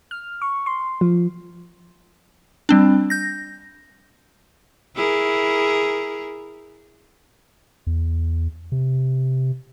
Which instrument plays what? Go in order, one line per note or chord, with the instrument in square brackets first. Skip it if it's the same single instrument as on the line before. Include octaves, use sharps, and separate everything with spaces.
[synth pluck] F6
C#6
C6
F3
[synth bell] G3 C4 D4
G6 A#6
[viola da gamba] E4 G#4 A#4
[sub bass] E2
C3